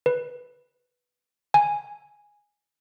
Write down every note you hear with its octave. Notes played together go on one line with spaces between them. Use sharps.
B4
G#5